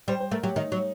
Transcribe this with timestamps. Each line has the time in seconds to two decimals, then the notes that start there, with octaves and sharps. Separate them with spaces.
0.08 G3 C5
0.20 C5
0.32 A3 A#4
0.43 F#3 G4
0.56 D#3 D#4
0.72 F#3